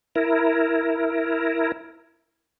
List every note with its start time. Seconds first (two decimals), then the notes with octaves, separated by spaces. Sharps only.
0.16 E4 A#4